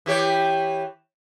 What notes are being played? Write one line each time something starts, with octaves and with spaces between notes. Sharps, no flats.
E3 G4 C#5